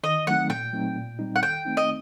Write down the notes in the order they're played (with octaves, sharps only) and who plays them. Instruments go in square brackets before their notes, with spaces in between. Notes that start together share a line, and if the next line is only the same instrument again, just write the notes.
[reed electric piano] D#3 [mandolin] D#5
[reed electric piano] F#3 A3 C4 D#4 [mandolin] F#5
[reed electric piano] A#2 [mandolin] G5
[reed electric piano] F#3 A3 C4 D#4
A#2
G3 C4 D#4
[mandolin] F#5
[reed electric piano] D#3 [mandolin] G5
[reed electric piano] A3 C4 D#4
[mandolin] D#5